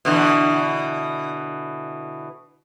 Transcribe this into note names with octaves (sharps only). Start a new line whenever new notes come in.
B2 D3 E3